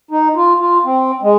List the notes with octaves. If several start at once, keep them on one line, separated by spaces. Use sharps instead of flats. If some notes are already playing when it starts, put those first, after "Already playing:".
D#4
F4
F4
C4
G#3